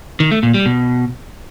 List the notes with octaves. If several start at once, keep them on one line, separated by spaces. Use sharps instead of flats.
D#3
A3
A#2
G3
B2